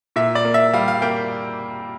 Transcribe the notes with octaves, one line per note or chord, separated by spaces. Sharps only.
A#2 E5
D5
A#3
E5
G3 F5
F5
A#3 G5